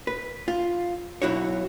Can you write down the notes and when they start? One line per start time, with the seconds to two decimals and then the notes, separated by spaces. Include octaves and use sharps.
0.07 B4
0.48 F4
1.22 B1 F#3 E4 F#4 C#5